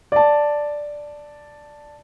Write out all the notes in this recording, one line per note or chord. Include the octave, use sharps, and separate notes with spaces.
D5 A5